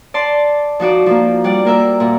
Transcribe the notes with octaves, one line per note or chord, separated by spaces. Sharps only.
D5 A5 C6
F3 D#4 F#4 D5
F3 A#3
G3 D5 F#5
A#3 A#4 E5
A#2